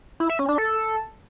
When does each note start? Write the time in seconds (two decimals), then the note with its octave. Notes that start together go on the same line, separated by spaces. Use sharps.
0.20 E4
0.30 E5
0.39 C#4
0.49 D4
0.58 A4